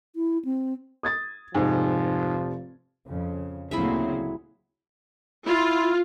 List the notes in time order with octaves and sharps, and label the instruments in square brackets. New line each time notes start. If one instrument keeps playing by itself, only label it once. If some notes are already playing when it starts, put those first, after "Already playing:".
[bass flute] E4
C4
[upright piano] D#6 G#6 A6
[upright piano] F1 [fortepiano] G#2 [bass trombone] F3
[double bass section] F2 C#3
[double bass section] D2 F#3 [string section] A#2 C#3 C4 [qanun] E4 G#4 E5
[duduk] E4 [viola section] F4